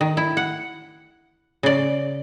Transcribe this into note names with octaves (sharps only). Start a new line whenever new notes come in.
D#3
E4
F#5
C#3 D5